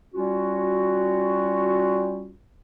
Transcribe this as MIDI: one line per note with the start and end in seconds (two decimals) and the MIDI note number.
0.14 2.32 55
0.14 2.32 61
0.14 2.32 65
0.14 2.32 66